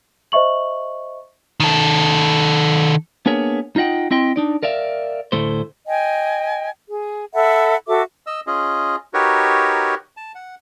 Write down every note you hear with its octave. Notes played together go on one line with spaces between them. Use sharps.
C5 D#5 E5 C#6 F#7
D#3 A4
A#3 B3 D4 G#4 A#4 C#5
D#4 F4 D#5 F#5 G5
C4 E4 D#5 G5 C6
D4 D#4 D5
A#4 D5 E5 F5
D2 A2 A3 C5
D#5 G5 G#5
G#4
A4 E5 F#5 B5
F#4 A4 E5 D6
D#5 E6
C#4 F4 G#4 D#5
D#4 F#4 G4 A#4 B4 C#5
A5
F#5